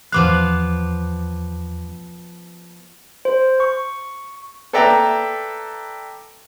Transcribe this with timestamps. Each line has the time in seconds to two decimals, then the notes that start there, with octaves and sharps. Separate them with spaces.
0.12 E2 F3 B3 F5 D6 F#6
3.25 C5
3.60 C#6
4.73 A4 B4 D5 E5 G5 A#5